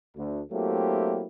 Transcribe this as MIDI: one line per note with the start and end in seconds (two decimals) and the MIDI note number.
0.16 0.41 38
0.52 1.26 54
0.52 1.26 57
0.52 1.26 58
0.52 1.26 60
0.52 1.26 64
0.52 1.26 67